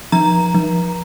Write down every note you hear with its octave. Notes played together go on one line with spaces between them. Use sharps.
F3 A#5
F3